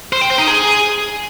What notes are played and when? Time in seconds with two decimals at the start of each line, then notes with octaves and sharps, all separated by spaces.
0.13 C5
0.21 G5
0.30 C5
0.39 D#4
0.47 G#4